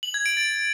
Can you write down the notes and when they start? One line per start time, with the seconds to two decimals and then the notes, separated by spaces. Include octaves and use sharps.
0.03 F#7
0.14 G#6
0.26 D7
0.37 A6